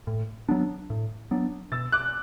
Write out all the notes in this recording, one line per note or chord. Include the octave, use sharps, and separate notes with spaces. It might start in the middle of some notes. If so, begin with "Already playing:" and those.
A2
F#3 B3 D4
A2
F#3 B3 D4
B2 E6 A6
D6 F#6